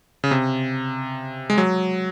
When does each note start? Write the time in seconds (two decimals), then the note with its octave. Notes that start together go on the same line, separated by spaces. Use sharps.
0.24 C#3
0.31 C3
1.50 G#3
1.58 F#3